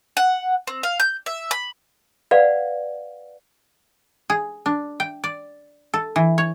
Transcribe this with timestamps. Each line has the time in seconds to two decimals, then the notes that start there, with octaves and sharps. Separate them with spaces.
0.17 F#5
0.67 C4
0.83 F5
1.00 G6
1.26 E5
1.51 B5
2.31 B4 D5 F5 F#5
4.30 G#4
4.66 D4
5.00 G5
5.24 D5
5.94 A4
6.16 E3
6.38 C#5